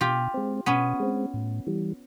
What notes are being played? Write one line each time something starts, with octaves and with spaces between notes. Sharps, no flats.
B2 F4 G4
G#3 C4
B2 B3 C#4
G#3 C4
A2
E3 G3